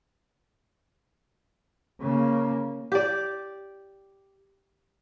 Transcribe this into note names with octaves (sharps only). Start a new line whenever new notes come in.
C#3 A#3
G4 D5